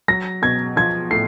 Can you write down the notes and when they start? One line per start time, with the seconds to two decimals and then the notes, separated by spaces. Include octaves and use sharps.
0.08 F#3 A#6
0.42 B2 G#6
0.76 F3 G#6
1.11 A2 C7